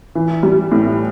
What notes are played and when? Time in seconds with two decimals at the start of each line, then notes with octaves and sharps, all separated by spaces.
0.15 E3
0.43 G3
0.72 A2